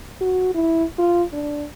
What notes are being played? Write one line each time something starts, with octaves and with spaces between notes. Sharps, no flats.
F#4
E4
F4
D4